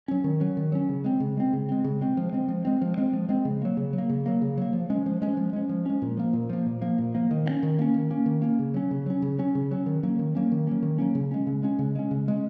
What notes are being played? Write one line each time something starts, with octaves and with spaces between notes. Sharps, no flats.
F#3 C#4
D#3
F#3 C#4
D#3
F#3 C#4
C#3
G#3 C4
C#3
G#3 C4
C#3
G#3 C4
C#3
G#3 C4
F3
G#3 C4
F3
G#3 C4
F3
G#3 C4
F3
G#3 C4
C#3
F#3 A#3
C#3
F#3
A#3
C#3
F#3 A#3
C#3
F#3 A#3
F3
G#3 C#4
F3
G#3 C#4
F3
G#3 C#4
F3
G#3 C#4
A#2
F3 A#3
A#2
F3 A#3
A#2
F3 A#3
A#2
F3 A#3
D#3
A#3
C#4
D#3
A#3 C#4
D#3
A#3 C#4
D#3
A#3 C#4
C#3
F#3 C#4
C#3
F#3 C#4
C#3
F#3 C#4
C#3
F#3 C#4
D#3
F#3 A#3 C#4
D#3
F#3 A#3 C#4
D#3
F#3 A#3 C#4
D#3
F#3 A#3 C#4
C#3
G#3 C#4
C#3
G#3 C#4
C#3
G#3 C#4
C#3
G#3 C#4